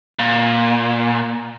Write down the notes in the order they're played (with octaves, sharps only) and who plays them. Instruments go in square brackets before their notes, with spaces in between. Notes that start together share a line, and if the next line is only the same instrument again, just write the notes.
[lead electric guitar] A#2